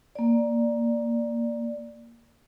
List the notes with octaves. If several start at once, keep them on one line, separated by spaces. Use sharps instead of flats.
A#3 D5